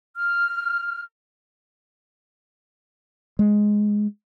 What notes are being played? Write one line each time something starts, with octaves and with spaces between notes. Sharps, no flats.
F6
G#3